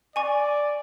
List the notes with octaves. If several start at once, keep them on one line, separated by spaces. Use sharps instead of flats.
D5 G#5 C#6